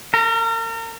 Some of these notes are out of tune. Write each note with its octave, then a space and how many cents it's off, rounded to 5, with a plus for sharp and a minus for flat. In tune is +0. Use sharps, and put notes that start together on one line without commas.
A#4 -35 A#5 +0